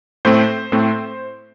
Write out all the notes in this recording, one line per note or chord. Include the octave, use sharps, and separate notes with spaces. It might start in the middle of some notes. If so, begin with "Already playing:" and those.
A2 A3 C4 C5
A2 A3 C4